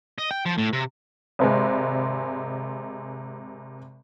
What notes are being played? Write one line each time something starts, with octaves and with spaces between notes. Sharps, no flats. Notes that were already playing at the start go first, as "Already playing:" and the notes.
D#5
G5
F3
A2
C3
G#1 C3 G#3